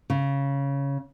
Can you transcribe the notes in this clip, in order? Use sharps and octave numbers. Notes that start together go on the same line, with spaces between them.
C#3